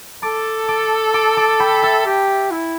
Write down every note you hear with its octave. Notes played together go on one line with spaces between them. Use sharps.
A4 A5 D6
A5 D6
A5 D6
A5 D6
G5 B5
E5 A5
G4
E4